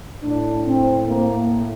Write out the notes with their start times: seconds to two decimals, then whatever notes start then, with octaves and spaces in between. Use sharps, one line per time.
0.22 A2 D4
0.65 C4
1.07 A#3